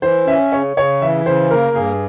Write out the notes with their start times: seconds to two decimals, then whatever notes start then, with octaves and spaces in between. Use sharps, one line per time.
0.02 E3 C5
0.27 C#4 E5
0.52 C#3 C#5
0.77 C#3 C#5
1.02 E3 E5
1.26 C#3 C5
1.51 A#3 A#4
1.75 G2 G#4